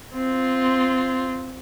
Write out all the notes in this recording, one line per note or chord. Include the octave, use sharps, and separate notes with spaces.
C4 F4